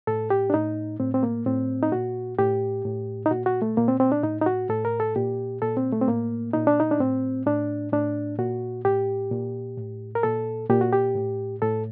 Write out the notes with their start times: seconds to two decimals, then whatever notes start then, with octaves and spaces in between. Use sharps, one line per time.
0.07 A2 A4
0.30 G4
0.50 D4
0.54 A2 D#4
1.00 A2 C4
1.14 C4
1.23 A#3
1.46 A2 C4
1.83 D#4
1.92 A#2 F#4
2.39 A2 G4
2.85 A2
3.26 D#4
3.31 A#2 F#4
3.46 F#4
3.62 A3
3.77 A#2 A#3
3.88 C4
4.00 C4
4.12 D4
4.23 A2 D#4
4.41 D#4
4.46 F#4
4.69 A2 A4
4.85 A#4
5.00 A4
5.16 A#2 G4
5.62 A#2 A4
5.77 C4
5.93 A3
6.01 C4
6.08 A2 A#3
6.53 A#2 D#4
6.67 D4
6.80 D#4
6.91 D4
7.00 A2 C4
7.46 A2 D4
7.93 A2 D4
8.39 A#2 F#4
8.85 A2 G4
9.31 A#2
9.77 A2
10.15 A#4
10.23 A#2 A4
10.70 A#2 G4
10.81 F#4
10.92 G4
11.15 A2
11.62 A2 A4